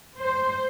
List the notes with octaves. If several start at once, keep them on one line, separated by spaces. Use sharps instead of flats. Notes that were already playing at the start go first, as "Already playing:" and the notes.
C5